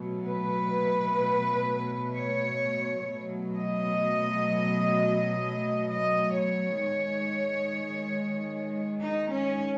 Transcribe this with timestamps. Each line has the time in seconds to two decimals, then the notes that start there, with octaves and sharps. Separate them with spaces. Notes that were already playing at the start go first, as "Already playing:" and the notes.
Already playing: B2 F#3 A3
0.28 B4
2.15 C#5
3.09 B2 F#3 A3
3.56 D#5
5.89 D#5
6.37 C#5
6.84 D#3 G#3
9.02 D#4
9.32 C#4